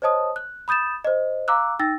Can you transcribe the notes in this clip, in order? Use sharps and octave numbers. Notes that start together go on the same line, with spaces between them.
C5 C#5 D#5 A5 D#6
F#6
B5 D#6 G6 A6 E7
C5 D#5
F5 A#5 D6 E6 F#6
D#4 G5 E6 A6 A#6